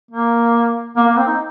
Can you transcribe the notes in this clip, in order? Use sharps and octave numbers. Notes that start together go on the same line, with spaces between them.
A#3
A#3
A#3
C4
D#4